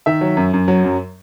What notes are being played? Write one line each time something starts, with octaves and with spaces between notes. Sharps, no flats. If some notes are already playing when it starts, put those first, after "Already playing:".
D#3 E5
F#3
F#2
F#2
F#3
F#2